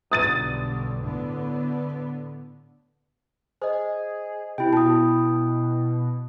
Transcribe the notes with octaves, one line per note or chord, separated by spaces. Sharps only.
B1 G2 D3 D#6 A6 D#7
A2 D3 B3
G#4 C5 D#5
C3 E4 G5
B2 A5 D#6